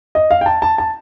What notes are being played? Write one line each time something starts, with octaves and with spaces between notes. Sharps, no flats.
D#5
F5
G5
A5
A5
A5